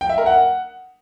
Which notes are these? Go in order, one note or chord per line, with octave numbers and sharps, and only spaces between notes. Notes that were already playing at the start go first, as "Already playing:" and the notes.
G5
E5
A#4
F#5